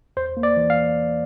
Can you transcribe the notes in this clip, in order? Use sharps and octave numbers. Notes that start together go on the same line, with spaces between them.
E2 C5
A#3
D5
E3
F5